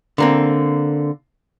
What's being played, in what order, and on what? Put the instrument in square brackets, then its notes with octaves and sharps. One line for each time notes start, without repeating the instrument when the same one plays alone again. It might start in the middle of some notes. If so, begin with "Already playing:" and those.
[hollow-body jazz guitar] D3 A#3 C4